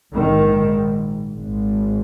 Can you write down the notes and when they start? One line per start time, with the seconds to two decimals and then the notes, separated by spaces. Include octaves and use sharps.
0.13 A#1 G#2 D#3
1.32 G#1 G#2